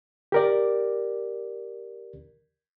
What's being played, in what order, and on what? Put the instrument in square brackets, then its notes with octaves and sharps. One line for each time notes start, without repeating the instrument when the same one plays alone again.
[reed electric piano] G4 A#4 D5